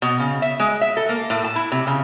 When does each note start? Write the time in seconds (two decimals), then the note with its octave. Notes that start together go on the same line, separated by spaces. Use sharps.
0.02 B2
0.20 C#3
0.42 E5
0.60 G#3
0.81 E5
0.97 A4
1.09 A#3
1.30 A2
1.44 A5
1.56 E4
1.72 C3
1.87 C#3